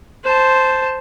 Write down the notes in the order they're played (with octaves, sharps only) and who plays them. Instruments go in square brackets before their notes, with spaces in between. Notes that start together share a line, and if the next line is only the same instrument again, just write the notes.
[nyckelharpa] C5 A5